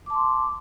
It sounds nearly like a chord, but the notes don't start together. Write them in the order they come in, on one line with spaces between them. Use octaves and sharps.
D6 A5 C6